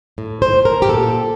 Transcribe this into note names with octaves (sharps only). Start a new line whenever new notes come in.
A2
C5
A2
A#4
G4
A#2 A4